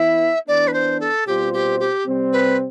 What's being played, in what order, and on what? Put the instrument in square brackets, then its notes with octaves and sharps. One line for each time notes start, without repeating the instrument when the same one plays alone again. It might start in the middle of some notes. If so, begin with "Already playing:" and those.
Already playing: [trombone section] E3 B3 E4 [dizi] E5
[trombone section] E3 B3 D4 [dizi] D5
[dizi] B4
C5
A4
[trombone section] B2 G3 C4 F4 C5 [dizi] G4
[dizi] G4
G4
[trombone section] C3 G3 C4
[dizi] B4